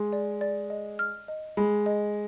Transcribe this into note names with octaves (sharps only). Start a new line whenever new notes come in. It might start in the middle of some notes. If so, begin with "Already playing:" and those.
Already playing: G#3 C6
D5
D5
D#5
F6
D#5
G#3 B5
D#5